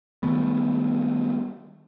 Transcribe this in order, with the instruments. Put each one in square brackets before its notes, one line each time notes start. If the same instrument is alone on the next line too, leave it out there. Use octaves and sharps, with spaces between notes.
[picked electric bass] D#3 G3 A3 B3